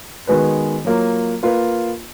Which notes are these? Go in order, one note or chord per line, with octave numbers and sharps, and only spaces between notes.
D#3 G#3 B3 F#4 B4
F#3 A#3 F4
A#3 F4 B4